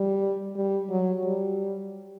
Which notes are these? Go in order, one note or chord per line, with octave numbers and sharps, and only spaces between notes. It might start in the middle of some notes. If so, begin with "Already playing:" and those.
Already playing: G3
G3
F#3
G3